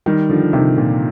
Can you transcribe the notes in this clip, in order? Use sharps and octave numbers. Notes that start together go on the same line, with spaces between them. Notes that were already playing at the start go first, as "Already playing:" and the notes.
D#3 G3
D3 F3
C3 D#3
A#2